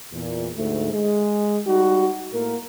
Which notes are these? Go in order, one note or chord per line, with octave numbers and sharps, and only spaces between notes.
E2 A#2
D2 G#2 A3
G#3
G3 D#4 F#4
A2 A#3 A#4